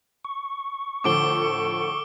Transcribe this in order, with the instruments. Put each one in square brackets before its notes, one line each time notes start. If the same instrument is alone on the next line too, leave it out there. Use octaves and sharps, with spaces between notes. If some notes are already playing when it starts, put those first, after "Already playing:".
[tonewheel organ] C#6
[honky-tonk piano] A2 D3 F3 [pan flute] A4 [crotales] D6 D7 G7